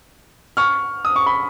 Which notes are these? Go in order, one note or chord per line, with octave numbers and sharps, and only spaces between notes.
C#6 F6
D#6
C#6
B5